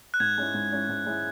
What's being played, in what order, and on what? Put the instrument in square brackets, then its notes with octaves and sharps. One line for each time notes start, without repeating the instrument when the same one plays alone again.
[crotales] F#6
[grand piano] G#2 [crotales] G#6
[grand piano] G#3 C#4 E4
G#2
G#3 C#4 E4
G#2
G#3 C#4 E4